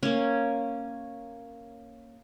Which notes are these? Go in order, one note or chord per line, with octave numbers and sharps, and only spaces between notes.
A#3 C#4